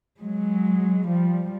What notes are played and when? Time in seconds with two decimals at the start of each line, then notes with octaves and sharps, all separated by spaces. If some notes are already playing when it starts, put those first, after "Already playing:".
0.20 F#3 G#3
1.06 F3 G3